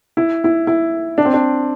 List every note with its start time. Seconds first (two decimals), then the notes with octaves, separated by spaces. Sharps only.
0.17 E4
0.44 E4
0.67 E4
1.18 D4
1.25 C4
1.33 D4